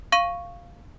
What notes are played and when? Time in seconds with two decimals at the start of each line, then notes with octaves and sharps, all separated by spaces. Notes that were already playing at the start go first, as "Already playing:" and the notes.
0.12 F5 C#6 D#7